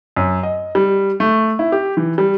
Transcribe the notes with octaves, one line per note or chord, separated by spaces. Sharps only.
F#2
D#5
G3
A3
E4
G4
E3
G3